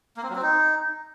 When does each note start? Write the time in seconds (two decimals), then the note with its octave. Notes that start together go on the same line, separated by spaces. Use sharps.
0.17 A#3
0.23 C4
0.29 F#3
0.36 C4
0.42 D#4